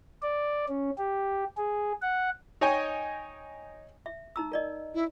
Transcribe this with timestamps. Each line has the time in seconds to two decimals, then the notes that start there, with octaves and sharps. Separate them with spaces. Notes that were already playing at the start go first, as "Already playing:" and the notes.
0.22 D5
0.68 C#4
0.98 G4
1.57 G#4
2.02 F#5
2.61 D#4 C#5 D#5 G5 G#5
4.06 E5
4.36 D#4 A#5 E6
4.52 A#4 D5 D#5
4.94 E4